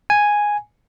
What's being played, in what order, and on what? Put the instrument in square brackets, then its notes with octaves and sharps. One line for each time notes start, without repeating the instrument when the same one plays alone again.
[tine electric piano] G#5